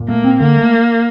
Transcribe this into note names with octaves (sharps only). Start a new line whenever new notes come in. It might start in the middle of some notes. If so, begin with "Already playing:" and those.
Already playing: A#2
A3 A#3
C4
D3 A#3
A3